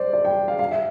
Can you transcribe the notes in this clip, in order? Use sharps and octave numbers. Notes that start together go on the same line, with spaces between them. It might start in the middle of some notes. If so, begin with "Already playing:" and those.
Already playing: C5 D5
D5
G5
F5
F5
E5